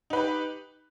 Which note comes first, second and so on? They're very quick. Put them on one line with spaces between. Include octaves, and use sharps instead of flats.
D#4 B4 G4